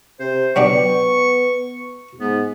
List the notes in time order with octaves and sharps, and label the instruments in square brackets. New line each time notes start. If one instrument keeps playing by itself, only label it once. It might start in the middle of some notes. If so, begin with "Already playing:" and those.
[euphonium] C3 [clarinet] C5
[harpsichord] F#3 D4 G4 [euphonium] B3 [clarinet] C#6
[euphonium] G#2 [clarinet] B3